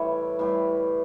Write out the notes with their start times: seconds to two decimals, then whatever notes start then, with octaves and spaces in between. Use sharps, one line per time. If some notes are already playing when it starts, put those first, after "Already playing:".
Already playing: A2 E3 G3 C#5
0.39 A2 E3 G3